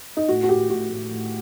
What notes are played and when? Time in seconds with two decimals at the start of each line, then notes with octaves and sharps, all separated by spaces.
0.17 D#4
0.28 A2 F#4
0.43 F#4
0.49 A2 G4
0.69 A2 F#4
0.90 A2
1.11 A2